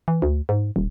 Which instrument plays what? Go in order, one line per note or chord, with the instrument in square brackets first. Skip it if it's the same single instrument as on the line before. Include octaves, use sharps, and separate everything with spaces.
[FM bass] E3
D2
G#2
D#1